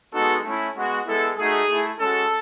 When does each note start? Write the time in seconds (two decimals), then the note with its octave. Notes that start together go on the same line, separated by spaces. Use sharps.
0.13 G#3 B3 D#4 F#4 A4
0.44 A3 C#4 E4
0.76 G#3 B3 F#4
1.06 G#3 B3 E4 A4
1.38 A3 D#4 F#4 G#4
1.69 A3 E4
2.00 G#3 C#4 F#4 A4